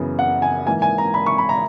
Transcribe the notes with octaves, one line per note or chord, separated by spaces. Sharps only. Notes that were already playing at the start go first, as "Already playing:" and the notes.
Already playing: F#2 C#3 E3 B3
F#5
G#5
G#2 E3 A#3 G#5
G#5
A#5
B5
C#6
B5
A#5